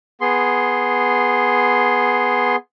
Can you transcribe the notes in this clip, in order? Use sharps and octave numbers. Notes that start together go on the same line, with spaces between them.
B3 G#4 C6